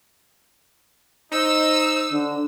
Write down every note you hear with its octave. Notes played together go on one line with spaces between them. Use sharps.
D#4 C5 E6
D3